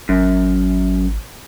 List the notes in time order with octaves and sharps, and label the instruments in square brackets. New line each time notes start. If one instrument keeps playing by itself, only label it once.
[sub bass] G#1 [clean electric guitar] F#2